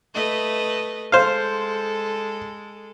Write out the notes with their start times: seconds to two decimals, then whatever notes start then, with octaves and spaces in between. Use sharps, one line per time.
0.14 A3 B4 D#5
1.12 G#3 A4 C5 F5